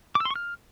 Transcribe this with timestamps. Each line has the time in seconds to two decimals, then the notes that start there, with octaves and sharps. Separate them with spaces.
0.15 D6
0.20 E6
0.25 C6
0.30 C#6
0.36 F6